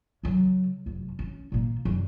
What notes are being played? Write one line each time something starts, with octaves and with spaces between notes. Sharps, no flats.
C#3 F#3
F1 F#2
C#4
A#2 A#3
F#2 G3